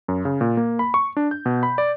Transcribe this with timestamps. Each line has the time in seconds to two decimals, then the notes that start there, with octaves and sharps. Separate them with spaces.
0.08 F#2
0.25 C#3
0.41 A#2
0.57 A#3
0.79 B5
0.94 C#6
1.17 D4
1.31 G6
1.46 B2
1.63 B5
1.78 D5